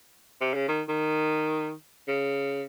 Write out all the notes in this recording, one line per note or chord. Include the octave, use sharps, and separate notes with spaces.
C3
C#3
D#3
D#3
C#3